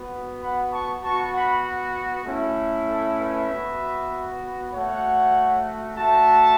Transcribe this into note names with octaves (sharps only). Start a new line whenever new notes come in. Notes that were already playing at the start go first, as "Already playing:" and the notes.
Already playing: B3 F#4
F#5 B5
A5 C#6
B3 F#4 A5 C#6
F#5 B5
A3 C#4 E4
A4
B4 E5
B3 F#4
A3 F#4 C#5 F#5
A3 F#4 E5 A5